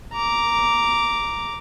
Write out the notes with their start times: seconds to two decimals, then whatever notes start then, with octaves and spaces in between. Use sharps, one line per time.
0.13 A#5 D6